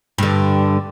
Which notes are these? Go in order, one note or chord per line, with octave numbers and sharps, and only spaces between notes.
G2 D3